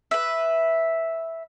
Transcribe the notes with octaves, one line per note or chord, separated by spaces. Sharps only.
B4 E5